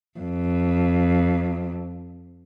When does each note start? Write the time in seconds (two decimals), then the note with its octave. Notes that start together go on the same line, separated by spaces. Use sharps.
0.20 F2